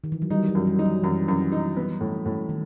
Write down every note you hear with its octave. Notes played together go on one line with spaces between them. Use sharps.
D#3
E3
F#3
G3 D#4
F#3
F#2
G3
D#4
F#3
F#2 E3
F#2
D#4
B3
A2
A2
D#3